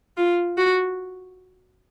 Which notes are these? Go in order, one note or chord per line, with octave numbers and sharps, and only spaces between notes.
F4
F#4